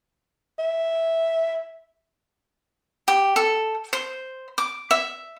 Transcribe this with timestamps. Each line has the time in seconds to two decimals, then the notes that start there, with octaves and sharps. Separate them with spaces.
0.59 E5
3.08 G4
3.36 A4
3.93 C5
4.58 D6
4.91 E5